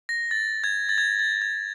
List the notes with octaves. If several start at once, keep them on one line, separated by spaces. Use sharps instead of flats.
A#6
A6
G#6
A6
G#6
A6
G#6